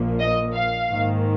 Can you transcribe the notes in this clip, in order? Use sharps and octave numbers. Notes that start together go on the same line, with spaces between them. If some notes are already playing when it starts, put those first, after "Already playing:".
Already playing: A#1 A#2 F3 A#3
D#5
F5
G#2 D#3 A#3